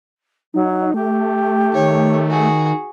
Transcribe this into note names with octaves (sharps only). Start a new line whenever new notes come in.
F#3 D#4
A3 G4
D#3 C#5
F#4 G#4